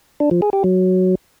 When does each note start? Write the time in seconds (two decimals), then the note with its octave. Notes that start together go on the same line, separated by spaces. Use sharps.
0.20 D4
0.31 F3
0.42 G#4
0.53 G4
0.64 F#3